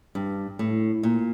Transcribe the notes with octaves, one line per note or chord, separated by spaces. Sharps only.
G2
A2
A#2